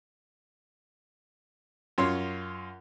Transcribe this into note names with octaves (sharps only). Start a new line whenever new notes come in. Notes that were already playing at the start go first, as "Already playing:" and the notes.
F#2 F4 C#5 C6